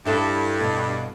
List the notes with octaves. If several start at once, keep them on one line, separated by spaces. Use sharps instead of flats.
G2 E4 A4 C5
B2